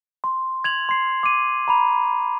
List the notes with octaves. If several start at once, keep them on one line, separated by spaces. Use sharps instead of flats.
C6
G#6 F7 F#7
C6 C7
D6 D#7
A#5 B5 F7